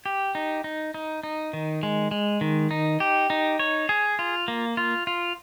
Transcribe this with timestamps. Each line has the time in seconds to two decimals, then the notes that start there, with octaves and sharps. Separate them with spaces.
0.06 G4
0.35 D#4
0.64 D#4
0.94 D#4
1.23 D#4
1.53 D#3
1.83 G#3
2.11 G#3
2.41 D#3
2.71 D#4
3.00 G4
3.30 D#4
3.59 C#5
3.89 G#4
4.19 F4
4.48 A#3
4.77 F4
5.07 F4